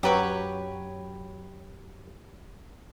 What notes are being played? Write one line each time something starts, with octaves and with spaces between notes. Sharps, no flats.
F#2 F#3 F#4 G4 B4 C#5